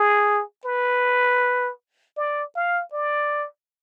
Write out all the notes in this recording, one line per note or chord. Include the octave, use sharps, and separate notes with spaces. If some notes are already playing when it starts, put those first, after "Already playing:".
Already playing: G#4
B4
D5
F5
D5